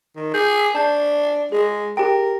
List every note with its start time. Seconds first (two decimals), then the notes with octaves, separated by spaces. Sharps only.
0.16 D#3
0.34 G#4 G6
0.75 D4 A5 G6 C7
1.52 G#3 G#4
1.97 G4 A#4 G5